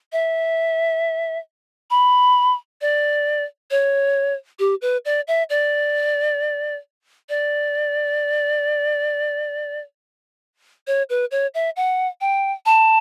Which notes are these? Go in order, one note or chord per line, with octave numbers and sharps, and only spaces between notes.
E5
B5
D5
C#5
G4
B4
D5
E5
D5
D5
C#5
B4
C#5
E5
F#5
G5
A5